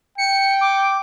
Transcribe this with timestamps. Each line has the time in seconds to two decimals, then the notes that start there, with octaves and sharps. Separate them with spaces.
0.18 G5 C#7
0.61 D6